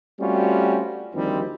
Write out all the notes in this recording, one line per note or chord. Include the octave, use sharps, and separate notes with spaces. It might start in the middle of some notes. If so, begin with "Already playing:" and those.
G3 A3 C4 C#4 F4 F#4
D2 D#3 F3 G3 C4